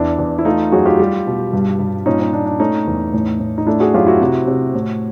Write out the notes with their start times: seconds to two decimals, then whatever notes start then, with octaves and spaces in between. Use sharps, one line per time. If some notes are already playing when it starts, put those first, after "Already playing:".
Already playing: E2 D4 E4
0.18 E2
0.39 E4
0.45 A3 D#4 F4
0.72 F#2 F#4 G#4
0.85 F4 G4
0.99 G3
1.27 B2
1.53 G2
1.80 G2
2.06 A#2 C#4 D#4
2.20 C#4
2.33 A#2 D4
2.46 D4
2.59 A3 C#4 D#4
2.87 E2
3.13 A2
3.40 A2
3.58 D#4
3.67 A3 D4 E4
3.80 F#4 G#4
3.94 F#2 F4 G4
4.07 E4 F#4
4.21 C3
4.47 C3
4.74 A2